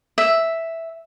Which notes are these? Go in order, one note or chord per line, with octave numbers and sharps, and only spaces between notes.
E5